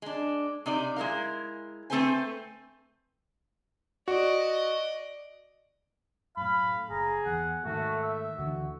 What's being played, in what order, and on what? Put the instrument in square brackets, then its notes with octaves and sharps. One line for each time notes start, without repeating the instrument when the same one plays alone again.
[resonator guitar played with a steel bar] G#3 D4
C3 D#4 D5
G#3 E4 G4 A#4 F5
A3 C4 A4 B4 C5 G#5
[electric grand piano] F#4 [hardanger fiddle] D5 D#5
[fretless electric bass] F#2 A2 [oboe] F5 [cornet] B5
[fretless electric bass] F#1 [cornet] G#4 [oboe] A#5
[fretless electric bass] E2 [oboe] F#5
[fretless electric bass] G#2 D#3 [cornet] A3 [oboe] F#4
[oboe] E5
[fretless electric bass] D2 D3 E3 [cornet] F#4